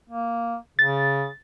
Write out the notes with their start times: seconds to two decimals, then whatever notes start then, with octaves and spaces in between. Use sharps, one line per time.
0.10 A#3
0.79 C#3 A6